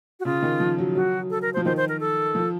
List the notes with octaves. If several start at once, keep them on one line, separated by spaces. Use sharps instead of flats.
F#4
C#3 F4
D#3
F3
F#3
F#3 F#4
A4
A#4
C5
F3
D#3 C5
C5
A#4
A4
F3